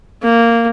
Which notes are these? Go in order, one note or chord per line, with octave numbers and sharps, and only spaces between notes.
A#3